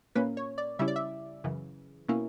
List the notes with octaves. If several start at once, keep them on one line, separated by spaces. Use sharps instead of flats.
A#2 A#3 C#4 B4
C#5
D5
C#3 G3 C#4 E4 E5
D5
E5
F#2 C#3 E3
B2 A#3 C#4 E4